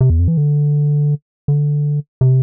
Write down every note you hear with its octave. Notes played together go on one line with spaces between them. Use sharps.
C3
E2
F2
E3
D3
D3
C3